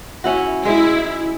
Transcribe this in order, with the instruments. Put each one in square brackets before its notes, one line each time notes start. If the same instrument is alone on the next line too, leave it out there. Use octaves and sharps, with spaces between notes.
[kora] C#4 E4 F#4
[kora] G#3 [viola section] E4